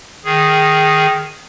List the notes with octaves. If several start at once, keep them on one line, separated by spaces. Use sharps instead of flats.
D#3 G#4